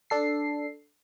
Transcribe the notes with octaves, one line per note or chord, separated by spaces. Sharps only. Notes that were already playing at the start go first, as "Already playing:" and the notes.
D4 A4 C7